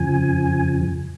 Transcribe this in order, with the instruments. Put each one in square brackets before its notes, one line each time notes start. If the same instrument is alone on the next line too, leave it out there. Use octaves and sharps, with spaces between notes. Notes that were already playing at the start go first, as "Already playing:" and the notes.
Already playing: [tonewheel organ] F2 C#3 F3 G#5